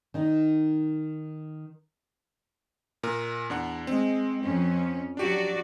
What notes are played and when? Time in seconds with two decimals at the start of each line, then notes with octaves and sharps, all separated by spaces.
0.14 D#3 D#4
3.03 A#2 A#4
3.50 E2 D4 F#5
3.87 G#3 C4
4.43 F2 C#4
5.17 F#3 D4 F#4 G4 D5